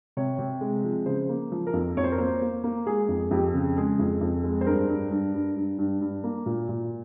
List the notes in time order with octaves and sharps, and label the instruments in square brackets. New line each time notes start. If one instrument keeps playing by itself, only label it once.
[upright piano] C3 C#5
C3
G#3
F3
C#3 C5
A#3
F3
A#4
F2
F2 C#5
C5
A#4
A#3 C5
A#3
A#3
G#3 G#4
F2
F2 G4
C#3
G#3 G#4
F2
F2
G#3
C5
G2 A#4
G2
G2
G2
G2
G2
G2
A#3
A#2
A#2